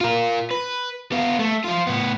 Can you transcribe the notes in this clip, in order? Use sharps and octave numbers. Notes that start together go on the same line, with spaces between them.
F4 A#4
B4
B3 F4
A3
F3 F4
A2 B3